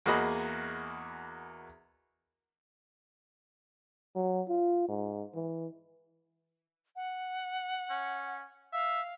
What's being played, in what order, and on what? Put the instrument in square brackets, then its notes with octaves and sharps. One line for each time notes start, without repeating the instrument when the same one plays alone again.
[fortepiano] E2 A#3 F#4 G#4 D#5 B5
[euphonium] F#3
F4
G#2
E3
[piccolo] F#5
[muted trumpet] C#4
[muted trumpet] E5 [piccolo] F5